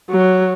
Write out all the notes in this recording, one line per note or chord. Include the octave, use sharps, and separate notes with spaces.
F#3